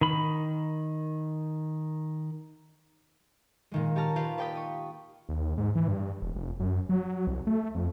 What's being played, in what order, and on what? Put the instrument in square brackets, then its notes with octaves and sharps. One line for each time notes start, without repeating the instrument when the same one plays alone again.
[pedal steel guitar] D#3 B5
[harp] A#2 D#3 G#3
G4 C#5 D#5 A5 A#5 F6
F4 G4 B4 F5
B4 D5 G5 D#6 B6
C#6 D#6
[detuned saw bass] D#2
G#2
E3
G2
E1
F1
F#2
F#3
C2
A3
F2